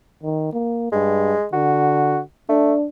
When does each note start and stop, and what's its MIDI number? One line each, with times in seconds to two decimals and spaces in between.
0.23 0.52 51
0.53 0.90 58
0.92 1.34 43
0.92 1.46 56
1.53 2.20 50
1.53 2.20 66
2.49 2.74 57
2.49 2.87 62